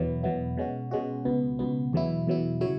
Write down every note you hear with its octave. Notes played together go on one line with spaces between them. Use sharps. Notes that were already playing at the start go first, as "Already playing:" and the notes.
Already playing: E2 B2 F#3 B3 E4
E2 B2 F#3 B3 E4
B2 G#3 C#4 F#4
B2 G#3 C#4 F#4
C#2 B2 B3
C#2 B2 B3
E2 B2 F#3 E4
E2 B2 F#3 E4
C#3 F#3 E4 C#5